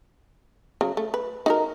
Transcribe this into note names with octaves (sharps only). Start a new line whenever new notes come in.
C#3 F#3
A3
B4
D#4 F#4 A#4